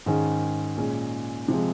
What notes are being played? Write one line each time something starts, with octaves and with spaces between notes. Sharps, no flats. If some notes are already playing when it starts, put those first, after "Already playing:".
G#2 D#3 G#3 C#4
A#2 G#3 C#4
C3 F3 G#3